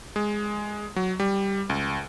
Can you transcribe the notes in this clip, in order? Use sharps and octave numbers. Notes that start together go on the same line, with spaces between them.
G#3
F#3
G3
C#2